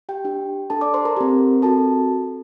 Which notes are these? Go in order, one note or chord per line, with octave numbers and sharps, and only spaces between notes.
G4 G5
D4 G4
D4 A4 A5
D5 D6
C5 C6
A#4 A#5
C4 G4
C4 F#4 A4 A5